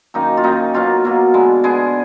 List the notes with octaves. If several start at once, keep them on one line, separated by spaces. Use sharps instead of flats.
F#2 D#3 A#3 D#4
F4
F#2 D#3 A#3 D#4
B2 F#3 A#3 F4
B2 F#3 A#3
D3 G#3 B3
D3 G#3 B3 G#4